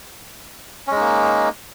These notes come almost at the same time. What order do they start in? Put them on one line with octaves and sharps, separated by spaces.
C#4 G#3 D#4 A#3